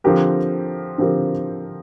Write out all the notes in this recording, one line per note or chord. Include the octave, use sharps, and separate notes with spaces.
D3 F3 C4 G4 A#4
D3 F3 C4 G4 A#4